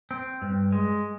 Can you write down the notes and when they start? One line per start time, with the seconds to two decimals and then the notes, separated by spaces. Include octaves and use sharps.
0.11 C4
0.42 G2
0.72 G#3